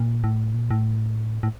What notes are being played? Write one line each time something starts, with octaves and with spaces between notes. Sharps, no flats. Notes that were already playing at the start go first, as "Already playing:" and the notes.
Already playing: A#2
A2
A#2
A2
A2